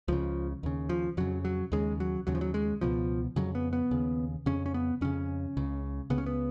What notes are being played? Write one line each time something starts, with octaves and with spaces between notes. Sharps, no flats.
C#2 C#3 F3
D#2 C#3
F3
F2 C#3 F#3
F#3
D#2 C#3 G#3
F#3
D#2 C#3 F#3
F3
F#3
G#3
C#2 B2 F3
F2 C#3 F#3
B3
B3
D#2 C#3
F2 C#3 C#4
C#4
B3
F2 C#3 C#4
C#2 C#3
C#2 C#3 B3
C#4
B3